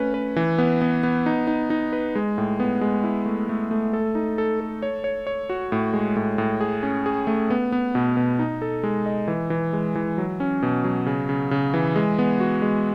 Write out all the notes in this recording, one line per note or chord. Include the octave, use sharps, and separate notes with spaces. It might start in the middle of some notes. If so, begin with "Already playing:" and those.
Already playing: A3 C#4 B4
B4
E3
B3
B3
B3
D#4
D#4
D#4
B4
G#3
A2
B3
G#3
E4
A3
A3
A3
A4
D#4
A4
A4
C#5
C#5
C#5
F#4
A2
G#3
A2
A2
G#4
C#4
G#4
A3
B3
B3
B2
B2
D#4
A4
G#3
D#5
E3
E3
G#3
E3
F#3
C#4
B2
F#3
C#3
C#3
C#3
E3
G#3
B3
F#4
G#3